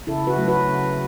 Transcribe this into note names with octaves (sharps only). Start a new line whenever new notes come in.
C#3 E4 A4
F#4 B4
F#3 A3
F#4 B4
C#3